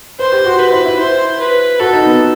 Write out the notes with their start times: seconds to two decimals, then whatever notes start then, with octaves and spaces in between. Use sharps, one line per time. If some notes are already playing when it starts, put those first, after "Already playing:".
0.19 B4 C5
0.32 G4
0.46 F#4
0.59 G4 B4
0.72 E4
0.86 E4
0.99 C5
1.40 B4
1.79 F#4 A4
1.93 D#4
2.06 B3